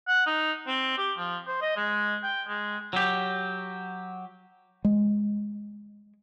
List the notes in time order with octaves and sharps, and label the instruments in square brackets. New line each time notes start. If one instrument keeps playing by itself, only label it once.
[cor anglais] F#5
D#4
C4
G4
F3
C5
D#5
G#3
G5
G#3
[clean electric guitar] F#3 G4
[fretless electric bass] G#3